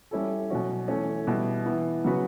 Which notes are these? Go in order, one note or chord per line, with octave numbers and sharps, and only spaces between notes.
G3 C#4 E4 A4
B2 F#3 C#4 F#4
E3 A3 C#4
B2 G3 B3 E4
E3 B3 E4
C#3 F#3 B3 F#4 B4